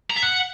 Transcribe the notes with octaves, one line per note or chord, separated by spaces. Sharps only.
A#5
E5
F#5